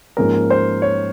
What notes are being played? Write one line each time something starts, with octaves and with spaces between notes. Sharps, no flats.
G#2 F3 A#3 C#4 G#4 A#4
C5
C#5